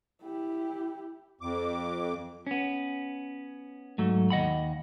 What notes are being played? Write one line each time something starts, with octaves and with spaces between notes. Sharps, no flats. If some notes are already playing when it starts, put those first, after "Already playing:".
E4 G4
F2 D6
B3 C#4
G#2 F#3 A3
D#2 D#5 F#5 B5